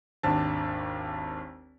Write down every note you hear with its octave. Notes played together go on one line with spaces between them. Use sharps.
G#1 D#2 D4 A5